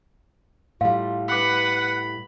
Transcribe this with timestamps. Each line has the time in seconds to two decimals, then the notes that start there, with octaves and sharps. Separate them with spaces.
0.81 A2 G3 F4 F5
1.29 B4 F#5 B5 D6 D#6